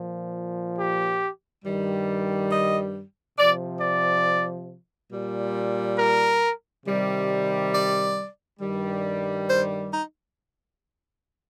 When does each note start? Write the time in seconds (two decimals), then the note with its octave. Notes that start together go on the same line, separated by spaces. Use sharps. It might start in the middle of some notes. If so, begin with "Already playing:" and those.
Already playing: A#2 F3
0.76 G4
1.63 G2 D#3 G3
2.51 D#5
3.37 C3 F3 D5
3.81 D5
5.12 A#2 G3
5.98 A#4
6.86 C3 D#3 G3
7.73 D5
8.60 G2 D#3 G3
9.47 C5
9.91 D#4